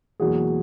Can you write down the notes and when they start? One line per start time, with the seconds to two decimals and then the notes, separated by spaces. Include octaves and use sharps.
0.20 E1 E2 B2 F#3 A#3 F#4 G#4